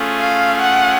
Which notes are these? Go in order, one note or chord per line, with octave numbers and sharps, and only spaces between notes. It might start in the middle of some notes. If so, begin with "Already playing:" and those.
Already playing: A3 C#4 F4 G#4
F5
F#5